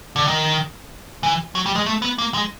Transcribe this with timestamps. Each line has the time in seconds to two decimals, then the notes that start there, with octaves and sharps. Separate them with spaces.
0.16 D3
0.27 D#3
1.23 E3
1.55 F#3
1.66 G3
1.76 G#3
1.86 A3
2.02 B3
2.18 A#3
2.34 G#3